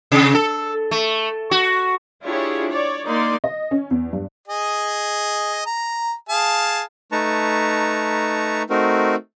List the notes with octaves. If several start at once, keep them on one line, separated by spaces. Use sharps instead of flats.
C3
A4
A3
F#4
D4 E4 F4 G4 G#4 C#5
C#5 D5
A#3 D#4 D5 C6
D#5
C#4
E2
G2
G#4 D#5
A#5
G#4 F5 A5
A3 D#4 B4 A5 A#5 C#6
A3 C4 D#4 F#4 A#4